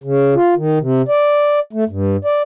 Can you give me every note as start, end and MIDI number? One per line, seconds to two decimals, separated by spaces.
0.04 0.34 49
0.35 0.55 65
0.56 0.79 51
0.81 1.02 48
1.08 1.60 74
1.73 1.84 57
1.89 2.17 43
2.25 2.42 74